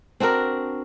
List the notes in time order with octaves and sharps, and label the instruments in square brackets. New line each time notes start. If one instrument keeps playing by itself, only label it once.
[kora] C4 D4 F#4 A#4